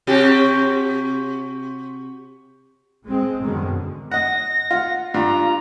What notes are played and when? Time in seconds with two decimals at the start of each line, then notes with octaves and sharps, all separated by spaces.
0.07 C3 F#4 G4
3.06 G#3 C4
3.42 F#2 B2 D3 D#3 G#3
4.11 D#5 F#5 A#6
4.71 F4 F#5
5.14 G2 F4 A#5